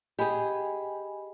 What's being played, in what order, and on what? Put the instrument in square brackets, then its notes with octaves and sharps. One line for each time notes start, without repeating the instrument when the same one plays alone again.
[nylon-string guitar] G4 G#4 [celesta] D#5 G#5 B5